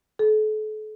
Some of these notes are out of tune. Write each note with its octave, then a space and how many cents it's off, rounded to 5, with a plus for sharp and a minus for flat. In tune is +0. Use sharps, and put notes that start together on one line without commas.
A4 -40